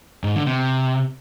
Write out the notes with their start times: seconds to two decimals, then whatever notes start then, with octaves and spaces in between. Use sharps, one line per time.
0.24 G#2
0.35 D3
0.47 C3